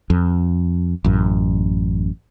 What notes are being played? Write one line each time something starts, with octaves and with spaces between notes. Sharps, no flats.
F2
A1 F#2